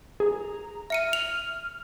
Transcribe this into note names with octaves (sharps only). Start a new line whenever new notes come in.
G#4 A#5
E5 F6 C#7 D#7
F7